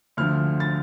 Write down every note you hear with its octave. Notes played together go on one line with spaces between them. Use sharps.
D2 D3 F3 F6
A6